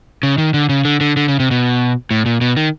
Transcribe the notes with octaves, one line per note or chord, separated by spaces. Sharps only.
C#3
D#3
D3
C#3
D3
D3
D3
C#3
C3
B2
A2
A#2
B2
D#3